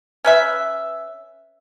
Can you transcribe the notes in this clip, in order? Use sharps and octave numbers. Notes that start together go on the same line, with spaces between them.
C#4 B4 E5